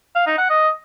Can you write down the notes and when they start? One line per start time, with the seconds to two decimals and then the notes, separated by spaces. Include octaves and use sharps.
0.15 F5
0.26 D#4
0.38 F#5
0.49 D#5